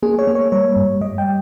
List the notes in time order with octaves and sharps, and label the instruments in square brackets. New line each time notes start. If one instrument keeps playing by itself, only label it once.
[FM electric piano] A#3 G#4
C#5
A#3
C#5
G3 C#5
G2
G3 D#5
G5